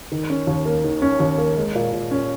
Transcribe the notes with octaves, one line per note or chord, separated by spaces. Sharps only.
D#3
C#4
D#2
A#3
D#3
C#4
D#2
A#3
G#3
A#2
A#2
C#4